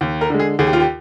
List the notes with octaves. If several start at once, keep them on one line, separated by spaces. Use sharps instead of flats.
D#2
A#4
D3 G#3
G#4
D#2 G#4
G4
F4
G4